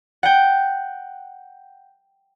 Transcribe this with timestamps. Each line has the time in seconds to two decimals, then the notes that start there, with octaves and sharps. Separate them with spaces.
0.23 F#5 G5